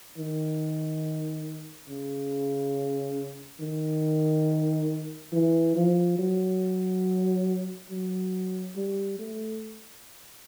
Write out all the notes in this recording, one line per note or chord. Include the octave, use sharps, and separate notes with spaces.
D#3
C#3
D#3
E3
F3
F#3
F#3
G3
A3